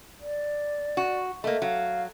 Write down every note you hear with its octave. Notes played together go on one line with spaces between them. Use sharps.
D5
F#4
A3 A#3 D#5
F#3 F5